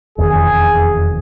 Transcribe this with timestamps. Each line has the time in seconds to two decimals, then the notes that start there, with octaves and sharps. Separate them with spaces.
0.18 E1 F2 D#3 G#4